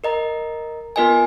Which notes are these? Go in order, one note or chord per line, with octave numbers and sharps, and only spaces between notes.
A#4 D#5 A#5
B3 F4 A#4 D#5 G#5